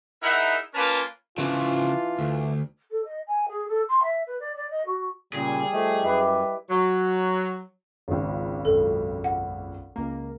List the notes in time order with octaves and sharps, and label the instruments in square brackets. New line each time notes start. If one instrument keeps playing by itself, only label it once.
[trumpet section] D#4 E4 G#4 A#4 E5 F#5
A#3 C#4 F4 A#4 B4 A5
[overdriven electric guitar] C#3 F3 [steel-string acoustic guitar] E3 D4 [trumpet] F4
[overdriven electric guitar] D2
[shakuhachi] A4
D#5
G#5
G#4
A4
C6
E5
B4
D5
D5
D#5
F#4
[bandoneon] A#2 C#3 [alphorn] G3 [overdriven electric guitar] G#4
[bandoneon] F3 A3 [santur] D#5
[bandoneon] F#2 [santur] E4 B4 D6
[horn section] F#3
[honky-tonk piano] G#1 C#2
[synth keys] B1 F#2 [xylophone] A4
[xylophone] F#5
[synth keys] C#2 A#3